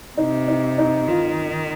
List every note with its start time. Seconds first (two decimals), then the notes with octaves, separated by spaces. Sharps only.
0.17 C3 D#4
0.48 D#4
0.78 D#4
1.08 D#3 F4